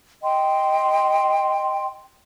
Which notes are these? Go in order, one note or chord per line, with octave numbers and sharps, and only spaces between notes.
D#5 G5 C6